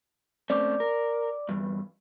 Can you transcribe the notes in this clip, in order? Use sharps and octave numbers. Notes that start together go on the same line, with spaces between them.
A3 C4 C#4 D5 D6
A#4
E2 G2